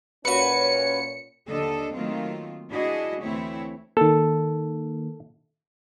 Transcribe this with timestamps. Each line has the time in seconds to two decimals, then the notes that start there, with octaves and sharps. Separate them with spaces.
0.25 A#2 C#4 F#4 B4 C#5 C#7
1.48 D#2 D3 D4 A4 D#5
1.94 D#3 F#3 A3 A#3 C4 F4
2.70 D4 E4 F#4 G#4 D#5
3.22 D2 E3 A3 C4 E4 C#5
3.97 D#3 A#3 A4